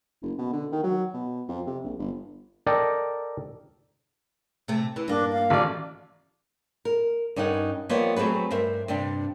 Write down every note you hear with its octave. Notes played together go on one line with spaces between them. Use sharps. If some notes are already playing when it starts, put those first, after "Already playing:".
F#1
B2
D3
D#3
F#3
B2
F2
C3
A#1
G1
A4 A#4 D5 D#5 G5
C3 A3
E3
G2 A#3 D4
F5
A1 D5
A#4
G2 C#4 D#4 A#4 F#5
F3 G3 A#3 B3 C#5 D#5
F#3 A3 C4 G#4 B4
G2 A#4 C5 E5
G2 C3 G3 D4